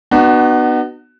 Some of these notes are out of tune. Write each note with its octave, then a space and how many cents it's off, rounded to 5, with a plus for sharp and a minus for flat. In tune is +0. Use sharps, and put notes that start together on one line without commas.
B3 +0 D#4 -45 F#4 +20